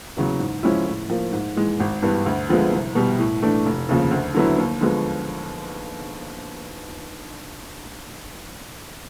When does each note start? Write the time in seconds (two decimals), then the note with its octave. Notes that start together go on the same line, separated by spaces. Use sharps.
0.17 E2 C#3 F#3
0.40 G#2
0.63 F3 G#3 C#4 E4
0.87 A2
1.10 F3 A#3
1.32 G#2
1.56 E3 G#3
1.80 G#1
2.02 G2 E3 G3 B3
2.26 D2
2.49 D3 F3 G#3 B3
2.72 C2
2.95 B2 G3
3.19 A2
3.42 E3 A3 D4
3.66 F1
3.89 D#2 C#3 F3
4.11 D2
4.35 D3 F#3 B3 E4
4.58 D#2
4.81 D3 F3 G#3 B3